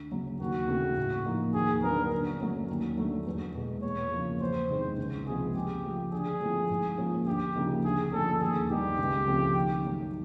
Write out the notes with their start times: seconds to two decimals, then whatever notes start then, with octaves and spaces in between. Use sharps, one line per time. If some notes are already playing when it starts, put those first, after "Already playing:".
Already playing: D2
0.12 C#3 F#3
0.40 D#2 F#4
0.68 C#3 E3 A3 C4
0.97 A2
1.26 F3 A#3 D#4
1.54 D#2 G#4
1.83 D3 F#3 B3 A#4
2.12 D3
2.40 F#3 A3 C#4
2.69 D#2
2.97 D3 F#3 A3
3.26 E2
3.54 B2 G#3
3.83 E2 C#5
4.12 C#3 F3 A#3
4.41 E2 C5
4.69 C3 D#3 G#3
4.98 C#2
5.27 C3 F3 G#3 B3 G#4
5.54 C#3 G4
5.84 F3 A3
6.12 D3 G#4
6.41 F3 A3 C4 E4
6.70 G#2
6.98 F3 A#3 C#4 F4
7.26 D2 G4
7.56 C#3 F3 A#3 D#4
7.84 D2 G#4
8.12 D3 F3 A3 C#4 A4
8.41 D#2 G#4
8.70 D#3 G3 B3 D#4 G4
8.98 C#2
9.27 C#3 F3 A3 C4
9.56 D#3
9.84 F#3 A3